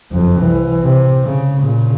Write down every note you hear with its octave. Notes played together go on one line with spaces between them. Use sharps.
F#1 F2
C2 E3
C3
C#3
A#2 C#3